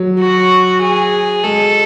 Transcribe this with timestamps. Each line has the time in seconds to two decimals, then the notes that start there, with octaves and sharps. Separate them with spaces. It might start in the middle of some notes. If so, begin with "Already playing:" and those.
Already playing: F#3
0.20 F#4
0.82 G#4
1.43 G#3 A4